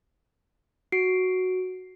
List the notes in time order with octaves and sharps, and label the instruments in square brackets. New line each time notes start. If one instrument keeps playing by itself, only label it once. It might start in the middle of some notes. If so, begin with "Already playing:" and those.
[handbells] F#4 C7 D7